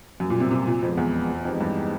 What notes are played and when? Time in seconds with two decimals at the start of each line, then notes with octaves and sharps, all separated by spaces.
0.20 F#2 B2 G3 A#3
0.30 A#2
0.40 C3
0.51 C3
0.67 A#2
0.82 F2 F3 G#3 B3
0.97 E2
1.45 F2 E3 G#3 B3 D#4 G4
1.61 G2